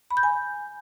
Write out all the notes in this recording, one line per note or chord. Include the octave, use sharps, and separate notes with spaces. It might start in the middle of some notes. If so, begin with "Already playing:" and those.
B5
G6
G#5